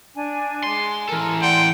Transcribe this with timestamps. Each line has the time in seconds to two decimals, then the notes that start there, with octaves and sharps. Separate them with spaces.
0.15 D4 G#5
0.63 G#3 C6
1.09 E3 A4 A#4
1.42 D5 F#5 G5 C6